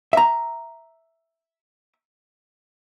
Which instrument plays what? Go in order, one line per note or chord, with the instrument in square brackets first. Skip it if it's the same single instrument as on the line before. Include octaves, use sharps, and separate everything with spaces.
[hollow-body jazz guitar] E5 A#5